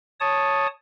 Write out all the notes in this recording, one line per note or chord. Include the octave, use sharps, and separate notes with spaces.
C#5 A5 D#6